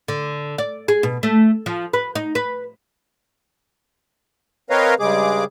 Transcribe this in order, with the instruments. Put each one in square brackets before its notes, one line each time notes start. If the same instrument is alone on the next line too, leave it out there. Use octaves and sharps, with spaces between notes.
[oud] D3
D5
G#4
B2
A3
F3
B4
D#4
B4
[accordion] C4 A#4 B4 C#5 D#5 F5
G2 C#3 G#3 G#4 D6